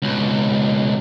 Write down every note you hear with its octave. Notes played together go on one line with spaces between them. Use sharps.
C#2 B2